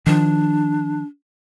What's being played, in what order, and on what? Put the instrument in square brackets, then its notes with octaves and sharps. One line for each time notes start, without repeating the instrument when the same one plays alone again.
[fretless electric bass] D#3 F3 [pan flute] D4